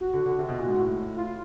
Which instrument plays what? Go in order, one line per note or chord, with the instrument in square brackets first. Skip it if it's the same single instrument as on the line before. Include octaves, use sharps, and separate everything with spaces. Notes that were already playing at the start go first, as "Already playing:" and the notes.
[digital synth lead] F#4
[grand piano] D3
D3
C3
B2
A#2
G#2
A2
[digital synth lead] F4